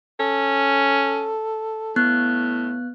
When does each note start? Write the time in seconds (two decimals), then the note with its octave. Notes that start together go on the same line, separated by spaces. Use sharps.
0.20 C#4 A4
1.96 A2 B3 F#6